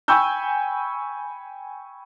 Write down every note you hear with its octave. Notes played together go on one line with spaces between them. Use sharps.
G5 G#5 B5 C#6 E6 G6